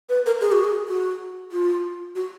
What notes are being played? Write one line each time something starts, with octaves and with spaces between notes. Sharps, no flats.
B4
A#4
G#4
F#4
G#4
F#4
F4
F#4